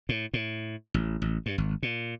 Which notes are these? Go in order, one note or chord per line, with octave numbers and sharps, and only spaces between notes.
A2
A2
A1
A1
G2
G#1
A#2